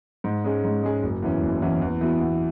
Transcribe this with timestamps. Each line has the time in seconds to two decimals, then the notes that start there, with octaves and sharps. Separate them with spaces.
0.24 G#2
0.44 G#3 C#4 G#4
0.64 G#2
0.83 G#3 C#4 G#4
1.03 F#1
1.22 E2 E3 C#4
1.42 F#1
1.62 E2 E3 C#4
1.82 E2
2.01 E3 B3 F#4
2.21 E2